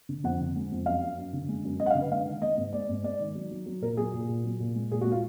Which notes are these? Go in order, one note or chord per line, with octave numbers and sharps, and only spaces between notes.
D3
F2 F#5
D3
G#3
F2
F#2 F5
F#2
F#2
D3
G#3
F#2
F#2 D#5
F#5
F5
D3
B4
G#3 F5
D#3
G#3 D#5
G#2
G#3 D5
G#2
G#3 D5
D#3
F#3
F#3
F#3
A#2 A#4
F#3 G#4
A#2
A#2
F#3
A#2
G#3
A#2 G#4
F#4
G#3 F4